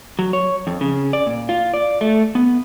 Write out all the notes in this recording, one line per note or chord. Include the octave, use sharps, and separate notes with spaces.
F#3
C#5
F2
C#3
D5
A#2
F4
D5
A3
B3